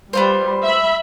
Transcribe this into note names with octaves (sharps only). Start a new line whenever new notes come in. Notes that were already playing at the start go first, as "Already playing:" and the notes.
G3 B3 F4 C5
E5 B5